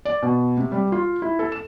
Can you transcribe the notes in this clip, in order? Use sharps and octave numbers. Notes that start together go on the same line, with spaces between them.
D5
B2
C3
G3
F4
E4
A4
E7